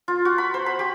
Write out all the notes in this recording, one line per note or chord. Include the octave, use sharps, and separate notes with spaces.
F4
F#4
B5
C5
B5
G4